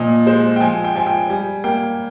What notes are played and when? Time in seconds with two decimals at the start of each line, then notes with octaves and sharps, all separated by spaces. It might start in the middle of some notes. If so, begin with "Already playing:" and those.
Already playing: A#2 F3 D#5
0.26 G#3 C5
0.56 G5
0.61 F3 G#5
0.84 G5
0.95 F3 G#5
1.07 G5
1.29 G3 G#5
1.64 A#3 G5